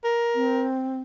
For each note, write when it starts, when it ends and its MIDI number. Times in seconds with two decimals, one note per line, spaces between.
0.04 0.66 70
0.35 1.01 60